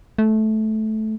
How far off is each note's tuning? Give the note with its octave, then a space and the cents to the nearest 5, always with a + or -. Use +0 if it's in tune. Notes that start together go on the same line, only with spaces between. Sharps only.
A3 -15